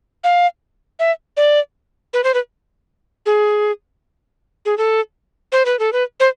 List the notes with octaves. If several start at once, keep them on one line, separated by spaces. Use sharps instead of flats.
F5
E5
D5
B4
C5
B4
G#4
G#4
A4
C5
B4
A4
B4
C5